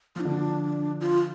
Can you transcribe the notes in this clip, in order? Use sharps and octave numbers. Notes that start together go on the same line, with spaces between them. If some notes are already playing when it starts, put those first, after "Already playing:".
F3 F4
D3 D4
F3
F4